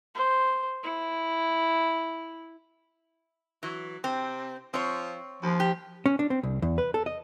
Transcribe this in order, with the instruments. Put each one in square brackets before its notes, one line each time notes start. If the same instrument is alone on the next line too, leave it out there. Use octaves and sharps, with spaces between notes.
[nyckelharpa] C5
E4
[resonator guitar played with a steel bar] E3 [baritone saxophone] F#3
[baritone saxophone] C3 [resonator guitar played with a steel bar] C4
[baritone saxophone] F3 [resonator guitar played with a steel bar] C4 C#5
[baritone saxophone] D#2 [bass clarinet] F3
[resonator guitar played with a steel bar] G4
[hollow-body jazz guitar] C#4
D4
C4
C2
E2
B4
A4
D#5